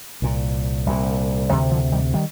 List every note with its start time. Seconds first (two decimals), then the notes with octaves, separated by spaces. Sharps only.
0.22 C2 A#2
0.86 C2 A#2
1.49 D2 C3 D#3 G3
1.71 D3 F3
1.92 D#3 G3
2.14 D#3 G3